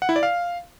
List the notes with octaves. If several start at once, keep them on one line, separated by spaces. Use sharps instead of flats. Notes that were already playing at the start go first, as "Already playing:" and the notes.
F#5
E4
D5
F5